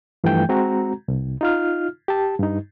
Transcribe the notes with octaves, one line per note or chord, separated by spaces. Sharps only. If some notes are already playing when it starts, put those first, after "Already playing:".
G2 E3 F3 A3 G5 G6
G#3 C4 F#4 A#5
C2
D#4 F4 F6
G4 A5
G2 D#4